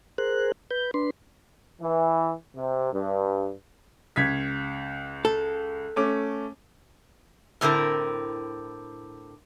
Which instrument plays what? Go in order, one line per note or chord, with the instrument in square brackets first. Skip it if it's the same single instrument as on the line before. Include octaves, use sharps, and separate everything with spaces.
[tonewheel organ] G#4 A#4 C5 F#6
B4 G6
D4 B4 C6
[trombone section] E3
C3
G2
[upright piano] C#2 G#6 B6
[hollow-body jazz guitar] A4
[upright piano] A3 C#4 D6
[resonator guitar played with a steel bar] A2 D3 C4 E4 A#4